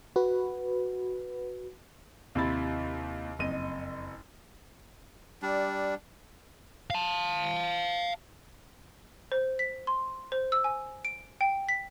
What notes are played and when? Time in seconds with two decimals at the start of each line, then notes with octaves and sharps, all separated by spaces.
0.16 F#4 B4
2.35 D#2 C3 C4 E4 B5 A6
3.39 F#1 F2 D#5 D#7
5.42 G3 D4
6.90 F5 A5
9.32 C5
9.59 B6
9.87 C6
10.32 C5
10.52 E6
10.64 G#5
11.05 D7
11.41 G5
11.69 B6